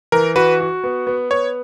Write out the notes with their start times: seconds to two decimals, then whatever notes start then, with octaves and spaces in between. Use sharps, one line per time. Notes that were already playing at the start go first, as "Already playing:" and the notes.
0.12 E3 A#4
0.36 F#4 B4
0.60 F#4
0.84 B3
1.07 B3
1.31 B3 C#5